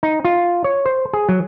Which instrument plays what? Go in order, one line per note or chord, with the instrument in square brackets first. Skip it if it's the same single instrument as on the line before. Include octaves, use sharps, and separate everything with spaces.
[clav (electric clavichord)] D#4
F4
C#5
C5
G#4
F#3